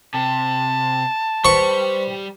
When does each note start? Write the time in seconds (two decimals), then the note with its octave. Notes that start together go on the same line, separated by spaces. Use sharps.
0.14 C3 A5
1.45 G3 B4 C5 C#6